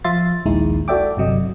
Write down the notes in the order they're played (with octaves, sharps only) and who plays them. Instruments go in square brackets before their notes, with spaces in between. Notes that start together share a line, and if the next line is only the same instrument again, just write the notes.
[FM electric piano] F3 E5 F5 C6 A6
A#1 D#2 G#3 D#4 E4
F#4 A4 D5 E5 G5 D6
G1 C3 F#3 D#5